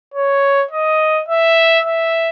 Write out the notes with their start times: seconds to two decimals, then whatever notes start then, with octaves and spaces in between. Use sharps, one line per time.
0.14 C#5
0.71 D#5
1.28 E5
1.85 E5